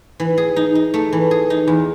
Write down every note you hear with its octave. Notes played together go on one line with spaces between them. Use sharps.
E3
G#4
D#4
D#4
A3
E3
G#4
D#4
E2